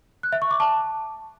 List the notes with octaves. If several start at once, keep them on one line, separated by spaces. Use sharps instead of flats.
F#6
E5
C#6
D6
A5